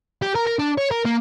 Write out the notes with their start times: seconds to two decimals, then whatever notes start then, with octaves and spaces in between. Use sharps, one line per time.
0.22 G4
0.35 A#4
0.47 A#4
0.59 D4
0.78 C#5
0.91 A#4
1.05 A#3